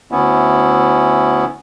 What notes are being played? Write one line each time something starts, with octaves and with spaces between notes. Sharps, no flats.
D2 B3 C#4 E4